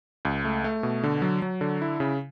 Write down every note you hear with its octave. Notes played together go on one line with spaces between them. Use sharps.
C#2
A3
A3
B2
D3
F#3
F#3
D3
E4
C#3